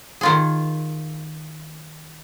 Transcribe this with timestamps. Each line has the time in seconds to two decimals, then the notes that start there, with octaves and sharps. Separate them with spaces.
0.21 D#3 F4 G#4